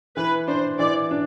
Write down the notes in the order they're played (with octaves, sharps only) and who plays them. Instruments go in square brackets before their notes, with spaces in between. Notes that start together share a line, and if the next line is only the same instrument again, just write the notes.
[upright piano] E3 [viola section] B4
[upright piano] D4 [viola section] C5
[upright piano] E3 [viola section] D5
[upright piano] D4